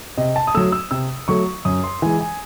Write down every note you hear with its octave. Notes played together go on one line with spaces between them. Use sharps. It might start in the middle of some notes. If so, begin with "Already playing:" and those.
C3 D#5
A5
D#6
F#3 A3 E6
E6
C3 E6
F#3 A3 C#6
F#2 D#6
C6
E3 G#3 G#5
G#5